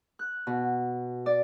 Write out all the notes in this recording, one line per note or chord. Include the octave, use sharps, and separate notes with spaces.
F#6
B2
D5